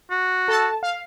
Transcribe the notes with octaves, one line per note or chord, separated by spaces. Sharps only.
F#4
A4 A5
F5